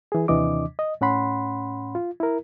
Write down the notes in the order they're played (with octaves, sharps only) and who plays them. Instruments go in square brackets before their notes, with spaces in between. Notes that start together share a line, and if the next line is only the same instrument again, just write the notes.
[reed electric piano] E3 G#4
D#2 C3 E3 D4 D#5 D6
D#5
A2 C#4 F#5 B5 C6
F4
E4 A#4